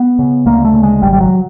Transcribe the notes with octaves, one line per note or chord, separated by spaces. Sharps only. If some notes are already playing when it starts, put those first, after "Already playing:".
Already playing: B3
C#3
D2 A#3
A3
C#3
G#3
G#1 G3
G3
F#3